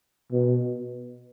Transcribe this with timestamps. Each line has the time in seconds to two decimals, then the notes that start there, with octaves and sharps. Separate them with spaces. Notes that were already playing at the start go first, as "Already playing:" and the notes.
0.32 B2